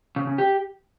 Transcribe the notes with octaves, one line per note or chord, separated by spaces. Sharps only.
C#3
C#3
G4